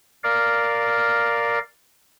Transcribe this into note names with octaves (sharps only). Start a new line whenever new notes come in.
A#4 D5 F5